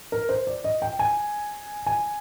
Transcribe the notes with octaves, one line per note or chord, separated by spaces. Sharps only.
A#4
C5
D5
D#5
G5
G#5
G#5